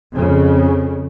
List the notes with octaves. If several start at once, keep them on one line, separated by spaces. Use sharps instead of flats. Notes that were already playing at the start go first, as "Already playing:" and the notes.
F2 C#3